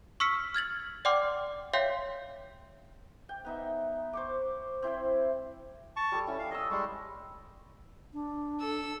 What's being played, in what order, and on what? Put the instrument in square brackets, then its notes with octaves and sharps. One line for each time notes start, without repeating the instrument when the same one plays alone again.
[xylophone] C#6 E6 F6 B6 C#7
F6 G#6 A6 F#7
D5 F#5 G5 C6 D6 F6
C#5 E5 F5 G5 C6 G6
[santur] G5
B3 D#4 E5
C5 C#6 D6
C4 E4 C5 G5
[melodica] A5 C#6
[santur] G3 A4
[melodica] C#4 [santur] E4 G4
[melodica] F5
[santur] C#5 D#6 E6 [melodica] D#5
[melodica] G3 G#3 [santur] C#6
[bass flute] D4
[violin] A4 E6